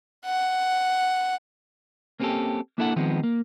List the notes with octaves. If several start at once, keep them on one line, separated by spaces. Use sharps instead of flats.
F#5
A#3 C4 C#4 F#4 G4 A4
A#3 D4 E4 A4 F5 F#5
D#3 F3 G#3 B3 C4
A#3